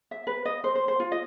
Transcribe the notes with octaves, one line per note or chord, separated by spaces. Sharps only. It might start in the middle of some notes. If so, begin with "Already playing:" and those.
E5
B4
D#5
C5
C5
C5
F4
D#5